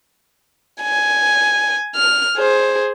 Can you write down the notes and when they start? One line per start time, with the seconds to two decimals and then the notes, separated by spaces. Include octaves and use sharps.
0.82 G#5
1.95 F6
2.37 G#4 C5